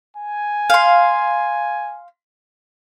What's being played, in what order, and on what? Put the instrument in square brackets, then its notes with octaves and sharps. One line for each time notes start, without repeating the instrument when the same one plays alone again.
[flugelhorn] G#5
[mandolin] F5 C6